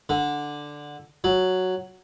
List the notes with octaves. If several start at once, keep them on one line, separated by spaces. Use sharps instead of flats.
D3
F#3